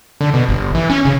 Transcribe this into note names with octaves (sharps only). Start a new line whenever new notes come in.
D3
B2
G1
E3
C#4
C#3